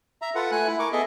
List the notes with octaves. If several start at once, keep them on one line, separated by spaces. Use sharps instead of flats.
E5 A#5
F4 A4 B4 F#5
A3 G#5 F#6
E4
A#4 C#6 D6
B3 G#4 A4 D#5 E5